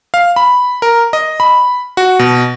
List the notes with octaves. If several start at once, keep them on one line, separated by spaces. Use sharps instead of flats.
F5
B5
A#4
D#5
B5
F#4
B2